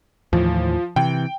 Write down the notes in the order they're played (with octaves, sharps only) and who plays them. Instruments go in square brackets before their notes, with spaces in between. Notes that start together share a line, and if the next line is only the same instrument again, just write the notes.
[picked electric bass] D#2 A2 E3 [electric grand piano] F3
[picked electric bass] C3 E3 [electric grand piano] G5